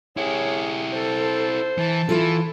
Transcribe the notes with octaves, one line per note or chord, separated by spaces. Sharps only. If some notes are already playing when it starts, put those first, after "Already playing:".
E4 G4 G#4 C#5
A4 C5
E3 A5
E3 E4 F4 A4